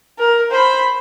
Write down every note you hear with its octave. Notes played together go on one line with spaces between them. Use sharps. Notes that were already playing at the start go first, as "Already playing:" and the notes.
A#4
C5 B5